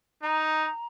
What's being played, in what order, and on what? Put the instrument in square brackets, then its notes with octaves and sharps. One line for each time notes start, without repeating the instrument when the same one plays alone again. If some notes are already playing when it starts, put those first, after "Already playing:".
[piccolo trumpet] D#4 [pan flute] A#5